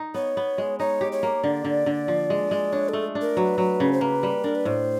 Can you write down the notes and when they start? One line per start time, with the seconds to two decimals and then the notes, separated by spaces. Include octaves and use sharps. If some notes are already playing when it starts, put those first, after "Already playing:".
Already playing: D#4
0.14 B3 C#5
0.37 B3
0.58 G#3
0.79 D#4 C#5
1.01 G4
1.12 C#5
1.23 A#3
1.44 D3 D5
1.65 D3
1.86 D3
2.08 F3
2.30 G#3
2.51 G#3
2.73 D4 C#5
2.89 A3 A4
3.15 D4
3.21 A#4
3.37 F#3 B4
3.58 F#3
3.80 C#3
3.93 C5
4.01 A#3 B4
4.23 G3
4.44 D4 A#4
4.55 B4
4.65 A2 C5